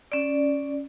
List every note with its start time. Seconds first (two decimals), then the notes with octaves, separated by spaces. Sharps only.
0.12 C#4 D5